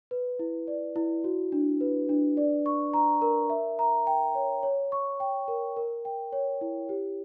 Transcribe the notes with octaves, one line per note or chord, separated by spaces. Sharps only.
B4
E4
D5
E4
F#4
D4
B4
D4
D5
C#6
A#5
A#4
E5
A#5
G5
C#5
C#5
C#6
G5
A#4
A#4
G5
C#5
E4
G4